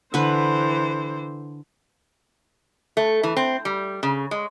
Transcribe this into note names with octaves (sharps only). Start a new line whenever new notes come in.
D3 E3 B4 C5
A3
E3
C4
G3
C#3
G#3